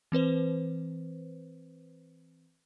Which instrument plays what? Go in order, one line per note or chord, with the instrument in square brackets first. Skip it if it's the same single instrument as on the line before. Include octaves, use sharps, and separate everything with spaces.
[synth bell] E3 C4 B4 C5